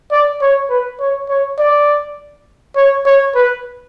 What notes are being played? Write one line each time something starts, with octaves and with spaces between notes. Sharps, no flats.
D5
C#5
B4
C#5
C#5
D5
C#5
C#5
B4